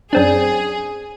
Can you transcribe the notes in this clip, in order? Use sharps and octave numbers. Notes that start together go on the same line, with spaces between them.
F#2 C4 D4 G#4